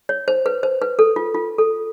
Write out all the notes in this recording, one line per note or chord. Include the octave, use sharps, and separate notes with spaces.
C#5
C5
B4
C5
B4
A4
F4
F4
A4